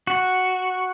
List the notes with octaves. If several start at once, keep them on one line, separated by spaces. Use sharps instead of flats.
F#4